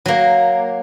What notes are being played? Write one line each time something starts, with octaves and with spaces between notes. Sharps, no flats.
F#3 A#3